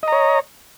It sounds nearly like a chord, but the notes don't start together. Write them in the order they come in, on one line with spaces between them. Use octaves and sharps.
D#5 A#5 C#5